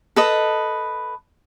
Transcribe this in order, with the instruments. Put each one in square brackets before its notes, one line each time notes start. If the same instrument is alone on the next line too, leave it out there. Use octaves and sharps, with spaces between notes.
[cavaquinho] A4 B4 D#5